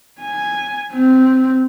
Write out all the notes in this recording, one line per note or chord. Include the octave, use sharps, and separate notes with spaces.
G#5
C4